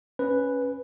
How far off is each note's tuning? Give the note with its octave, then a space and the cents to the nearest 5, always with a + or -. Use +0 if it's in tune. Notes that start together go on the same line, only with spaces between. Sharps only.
C#4 +0 B4 +0